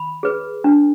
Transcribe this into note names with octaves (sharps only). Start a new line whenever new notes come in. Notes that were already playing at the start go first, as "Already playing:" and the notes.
Already playing: B5
G#4 B4
D4